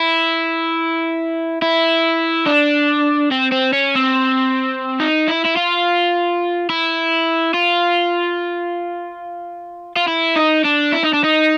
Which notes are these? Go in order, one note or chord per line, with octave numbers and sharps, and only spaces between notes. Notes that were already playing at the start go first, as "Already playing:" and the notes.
Already playing: E4
E4
D4
C4
C4
C#4
C4
D#4
E4
E4
F4
E4
F4
F4
E4
D#4
D4
E4
D#4
D4
D#4